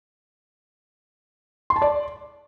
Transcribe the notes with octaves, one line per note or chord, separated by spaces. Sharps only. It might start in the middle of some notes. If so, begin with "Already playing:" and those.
C6
A5
D5